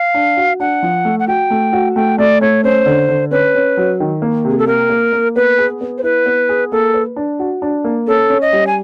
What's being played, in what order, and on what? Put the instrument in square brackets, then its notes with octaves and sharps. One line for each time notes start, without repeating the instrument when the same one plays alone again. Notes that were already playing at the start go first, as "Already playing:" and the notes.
Already playing: [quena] F5
[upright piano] D4
F#4
[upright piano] D4 [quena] F#5
[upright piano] F3
A3
[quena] F#5
[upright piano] F#4 [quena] G5
[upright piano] A3
F#4
[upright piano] A3 [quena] G5
[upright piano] A3 [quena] D5
[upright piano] A3 [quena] C#5
[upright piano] C#4 [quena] C5
[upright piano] D3
D3
[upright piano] C#4 [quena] B4
[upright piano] C#4
F#3
D#3
A#3
[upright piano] C3 [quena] G#4
[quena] A4
[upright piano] A#3 [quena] A#4
[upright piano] A#3
A#3
[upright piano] B3 [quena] B4
[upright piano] G#4
B3
[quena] C5
[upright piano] E4 [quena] B4
[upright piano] B3
G#4
[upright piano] A#3 [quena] A4
[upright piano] B4
D4
F#4
D4
A#3
[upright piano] C#4 [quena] A4
[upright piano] C#4
[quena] D#5
[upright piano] G3
[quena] G#5